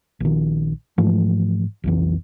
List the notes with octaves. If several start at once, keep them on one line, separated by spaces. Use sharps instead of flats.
A#1 D#3
G#2 E3 F3 A3
B1 F2 E3